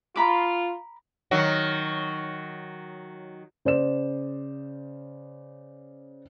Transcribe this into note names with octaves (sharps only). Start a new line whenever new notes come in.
F4 A#5 B5 D6
D#3 F#3 F#4
C#3 C5 D5 E7